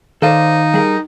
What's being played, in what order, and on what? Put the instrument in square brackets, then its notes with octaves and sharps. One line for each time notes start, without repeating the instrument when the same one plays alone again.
[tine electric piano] D#3 F5 [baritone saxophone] D#4 [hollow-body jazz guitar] A4 C5 D5
[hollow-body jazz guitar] G3 G#4 A#4